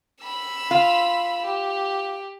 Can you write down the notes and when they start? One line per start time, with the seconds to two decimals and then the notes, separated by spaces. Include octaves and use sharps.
0.23 B5 E6
0.71 F4
1.45 G4